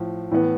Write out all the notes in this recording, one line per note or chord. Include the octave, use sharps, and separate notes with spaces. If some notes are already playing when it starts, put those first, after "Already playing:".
Already playing: A2 F3
A2 E3 B3